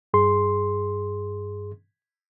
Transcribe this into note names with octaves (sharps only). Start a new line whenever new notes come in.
G2 G#4 C6